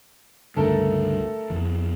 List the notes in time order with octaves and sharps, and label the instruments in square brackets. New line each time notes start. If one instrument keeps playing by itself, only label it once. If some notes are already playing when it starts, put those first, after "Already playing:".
[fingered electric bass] C#2 G2 D3 [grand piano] A3 A4 A#4
[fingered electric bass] F2 E3